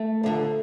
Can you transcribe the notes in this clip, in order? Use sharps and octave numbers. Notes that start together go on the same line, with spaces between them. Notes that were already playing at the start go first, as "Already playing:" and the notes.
Already playing: A3
D#2 D3 F3